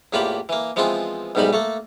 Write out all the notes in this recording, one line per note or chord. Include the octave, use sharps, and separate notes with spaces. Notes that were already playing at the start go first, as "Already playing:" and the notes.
E2 A2 A#3 F4 G4 B5
E3 A#3
E3 F3 G#3 B3 C4 F4
B1 E2 G#2 G3 D#4 B5
A3 A#3 A4